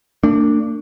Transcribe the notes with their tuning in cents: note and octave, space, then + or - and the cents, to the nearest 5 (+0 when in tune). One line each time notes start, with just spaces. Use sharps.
A#3 -45 D4 +0